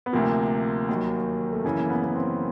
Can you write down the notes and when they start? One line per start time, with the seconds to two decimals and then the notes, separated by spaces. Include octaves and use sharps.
0.06 B3
0.13 D2 C3 F3 A#3
0.89 D#2 D#3 F#3
1.53 A3
1.65 F#2 C#3 E3 A#3
1.79 A#3
1.90 B3
2.04 B3
2.15 C4